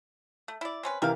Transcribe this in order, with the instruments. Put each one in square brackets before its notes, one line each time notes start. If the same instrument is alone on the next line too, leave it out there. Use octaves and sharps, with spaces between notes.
[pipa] A3
E4 D5
C4 C#4 B4
[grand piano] C3 E3 A#4 [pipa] G3 F5